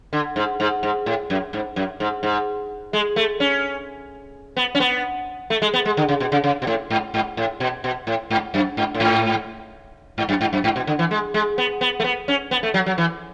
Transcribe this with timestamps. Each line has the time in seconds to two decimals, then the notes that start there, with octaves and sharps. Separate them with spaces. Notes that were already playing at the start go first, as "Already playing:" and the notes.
0.13 D3
0.36 G#2
0.60 G#2
0.83 G#2
1.06 A2
1.30 F#2
1.53 G#2
1.76 F#2
2.00 G#2
2.23 G#2
2.93 G#3
3.16 A3
3.40 C#4
4.57 B3
4.75 C#4
4.80 B3
5.50 A3
5.62 G#3
5.74 B3
5.85 G#3
5.97 D3
6.09 C#3
6.20 B2
6.32 C#3
6.44 C#3
6.62 B2
6.67 A2
6.90 G#2
7.14 G#2
7.37 A2
7.60 B2
7.84 B2
8.07 A2
8.30 G#2
8.54 F#2
8.77 G#2
8.95 A2
9.00 G#2
10.18 G#2
10.29 F#2
10.41 G#2
10.53 F#2
10.64 G#2
10.76 B2
10.87 D3
10.99 E3
11.11 G#3
11.34 G#3
11.58 B3
11.81 B3
12.00 A3
12.04 B3
12.28 C#4
12.51 B3
12.63 A3
12.74 F#3
12.86 F#3
12.98 E3